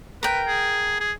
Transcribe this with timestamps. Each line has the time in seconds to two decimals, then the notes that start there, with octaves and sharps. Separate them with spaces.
0.23 A#4 B4 G5
0.47 G#4
1.00 G#4